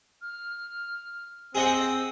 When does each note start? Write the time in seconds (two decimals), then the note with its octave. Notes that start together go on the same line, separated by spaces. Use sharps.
0.22 F6
1.55 C4 G#4 D#5 F#5 E6